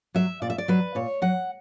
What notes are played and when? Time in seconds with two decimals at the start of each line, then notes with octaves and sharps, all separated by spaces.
0.15 F#3 E5
0.42 A#2 D5
0.50 E5
0.58 D5
0.68 F#3 B4
0.95 A#2 C#5
1.22 F#3 F#5